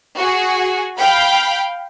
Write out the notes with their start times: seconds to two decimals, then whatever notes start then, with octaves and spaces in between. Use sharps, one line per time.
0.18 F#4 G#4
0.98 F5 G5 B5